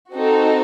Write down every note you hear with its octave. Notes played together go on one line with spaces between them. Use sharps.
C4 D#4 F#4 A4